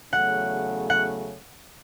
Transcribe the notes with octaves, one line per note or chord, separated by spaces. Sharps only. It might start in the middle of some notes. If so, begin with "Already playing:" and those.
E2 C#3 F#3 A3 C#4 F#5
F#5